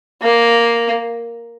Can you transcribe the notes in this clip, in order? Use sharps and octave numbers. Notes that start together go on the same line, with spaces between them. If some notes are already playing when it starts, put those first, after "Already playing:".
A#3